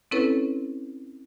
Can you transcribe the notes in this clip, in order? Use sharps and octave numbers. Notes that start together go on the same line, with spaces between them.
C4 C#4 E4 A4 B4 C#5